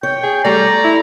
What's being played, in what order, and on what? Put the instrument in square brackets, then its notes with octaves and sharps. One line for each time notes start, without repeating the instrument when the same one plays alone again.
[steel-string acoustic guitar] C#5 [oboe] G5
[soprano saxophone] G#4
[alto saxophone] G3 [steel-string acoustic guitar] A3 [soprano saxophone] D5 [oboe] A#5
[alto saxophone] E4